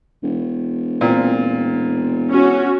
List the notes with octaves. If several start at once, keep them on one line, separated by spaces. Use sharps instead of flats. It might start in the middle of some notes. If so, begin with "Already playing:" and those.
E1
A#2 C4
C#4 F#4